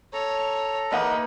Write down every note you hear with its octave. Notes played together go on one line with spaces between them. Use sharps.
A4 C#5 A#5
E3 A#3 D#4 A#4 B4 D#5 F#5